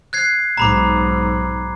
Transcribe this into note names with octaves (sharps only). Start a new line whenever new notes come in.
F#6 G#6 C7
B1 G#2 A#5 B5 D6